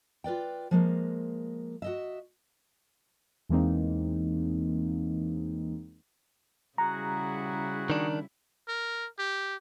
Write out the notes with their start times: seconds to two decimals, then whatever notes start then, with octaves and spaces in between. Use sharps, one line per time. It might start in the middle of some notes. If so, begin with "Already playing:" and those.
0.24 F4 B4 D5 G5
0.71 F3 G#3 A#3
1.82 F#4 D#5 E5
3.49 E2 E3 G#3 A#3 C4 D#4
6.78 C#3 G3 E4 F#4 G#4 F#5 A#5
7.90 D#3 D4
8.68 A#4
9.19 G4